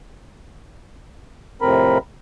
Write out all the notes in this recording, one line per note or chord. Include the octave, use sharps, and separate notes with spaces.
F2 A2 C3 C4 A#4 B5